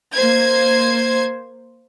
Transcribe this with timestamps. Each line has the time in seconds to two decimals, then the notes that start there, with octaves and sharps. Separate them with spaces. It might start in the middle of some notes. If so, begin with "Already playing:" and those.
0.14 A#3 C5 G#6